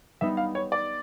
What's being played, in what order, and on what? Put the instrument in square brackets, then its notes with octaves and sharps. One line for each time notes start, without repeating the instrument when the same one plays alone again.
[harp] G3 B3 D#4 [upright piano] E5
[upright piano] F5
C#5
D5